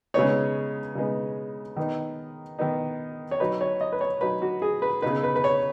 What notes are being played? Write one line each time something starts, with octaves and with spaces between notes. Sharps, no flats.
C#3 G#3 B3 D#4 C#5
C#3 G#3 B3 D#4
D#3 B3 D#4
D#3 B3 D#4
C#5
F#3 D#4 B4
C#5
D#5
B4
C#5
F#3 D#4 B4
F#4
G#4
B4
C#3 B3 D#4 B4
B4
B4
C#5